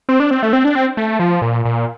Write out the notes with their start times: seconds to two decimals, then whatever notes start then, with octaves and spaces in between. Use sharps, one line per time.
0.09 C4
0.20 D4
0.31 C4
0.43 A3
0.53 C4
0.65 D4
0.75 C4
0.97 A3
1.19 F3
1.42 A#2
1.65 A#2